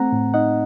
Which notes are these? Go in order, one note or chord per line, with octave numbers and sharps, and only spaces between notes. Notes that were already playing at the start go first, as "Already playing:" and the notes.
Already playing: A3 C4 F#5 A#5
A2
D#4 D#5 F#5